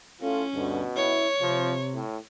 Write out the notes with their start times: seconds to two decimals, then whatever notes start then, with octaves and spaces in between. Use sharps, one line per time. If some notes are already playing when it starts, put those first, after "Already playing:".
0.22 A2 C#4 F4 A4
0.54 D2 G2 B2 D3
0.96 E4 C#5
1.41 C3 F3
1.94 A2